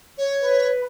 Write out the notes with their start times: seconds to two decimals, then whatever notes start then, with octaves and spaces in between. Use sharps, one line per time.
0.18 C#5
0.40 B4